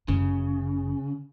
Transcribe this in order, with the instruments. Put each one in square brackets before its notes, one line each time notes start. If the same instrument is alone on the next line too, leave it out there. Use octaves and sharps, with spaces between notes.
[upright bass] G1 F#2 [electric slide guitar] C#3